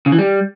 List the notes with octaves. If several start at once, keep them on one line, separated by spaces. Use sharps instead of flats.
C#3
E3
G3